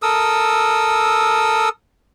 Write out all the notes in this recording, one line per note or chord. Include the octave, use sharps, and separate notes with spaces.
A4 A#4 D#6 E6